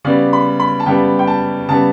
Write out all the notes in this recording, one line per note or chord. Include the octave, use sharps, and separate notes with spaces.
C#3 G3 B3 D5
B5
B5
A5
C#3 G3 B3 G5
G5
A5
C#3 G3 B3 A5